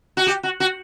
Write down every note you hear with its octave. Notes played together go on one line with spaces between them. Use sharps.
F#4
G4
F#4
F#4